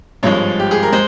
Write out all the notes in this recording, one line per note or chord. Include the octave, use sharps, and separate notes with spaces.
G#1 G2 F3 G#3 C#5
G4
G#4
A#4
G#3 C5